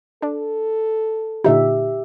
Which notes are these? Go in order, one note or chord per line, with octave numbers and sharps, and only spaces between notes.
D4 A4 D5
A#2 D3 D#4 G4 E5